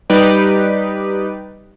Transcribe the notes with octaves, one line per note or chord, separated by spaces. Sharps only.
G3 D#4 G4 B4 D5